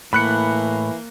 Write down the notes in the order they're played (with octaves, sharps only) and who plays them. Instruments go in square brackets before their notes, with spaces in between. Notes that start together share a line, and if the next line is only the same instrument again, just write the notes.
[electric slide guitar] A2 [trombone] E3 [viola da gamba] A#3 [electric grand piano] B5 F#6 C#7